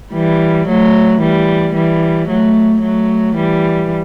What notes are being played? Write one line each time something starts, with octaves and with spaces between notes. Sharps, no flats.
E3 G3
F#3 A3
E3 G3
E3 G3
F#3 A3
F#3 A3
E3 G3